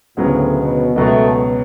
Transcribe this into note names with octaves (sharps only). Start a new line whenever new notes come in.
D2 A2 C#3 F#3 B3
B2
C#2 B2 F#3 A3 B3